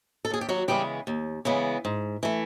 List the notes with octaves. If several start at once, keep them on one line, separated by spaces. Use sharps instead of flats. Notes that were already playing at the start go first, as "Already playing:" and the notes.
A4
D#2 G#4
G4
F#3 F#4
C#3 E3 G3 G#3 B3 G4
D#2
C#3 E3 G#3 B3
G#2
E3 A3